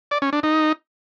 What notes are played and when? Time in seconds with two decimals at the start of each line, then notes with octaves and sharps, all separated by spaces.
0.11 D5
0.22 C#4
0.33 D4
0.43 D#4